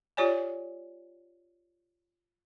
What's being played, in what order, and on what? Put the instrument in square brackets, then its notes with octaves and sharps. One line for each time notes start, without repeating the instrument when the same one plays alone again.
[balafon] F4 G4 C#5 D5 G#5